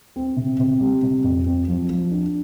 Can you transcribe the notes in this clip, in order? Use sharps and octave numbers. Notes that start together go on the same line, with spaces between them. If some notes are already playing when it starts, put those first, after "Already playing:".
C4
C3
C3
G3
C3
F2
C4
F3
F3
D4